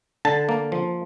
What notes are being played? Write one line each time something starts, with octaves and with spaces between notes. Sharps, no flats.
D3 A5
A#3
F3